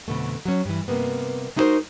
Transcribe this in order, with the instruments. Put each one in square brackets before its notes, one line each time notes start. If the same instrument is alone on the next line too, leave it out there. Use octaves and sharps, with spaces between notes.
[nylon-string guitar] F2 B2 D3 A3
F#3 C#4
G2 E3
G2 C3 A#3 B3
G#3 D#4 E4 F#4 A#4 C5